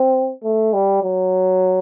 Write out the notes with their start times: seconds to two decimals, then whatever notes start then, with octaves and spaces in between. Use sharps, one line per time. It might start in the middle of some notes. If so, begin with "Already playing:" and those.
Already playing: C4
0.44 A3
0.73 G3
1.03 F#3